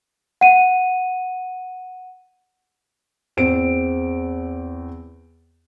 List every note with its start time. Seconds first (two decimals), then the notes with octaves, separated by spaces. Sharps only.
0.41 F#5 D#7
3.37 E2 C4 D7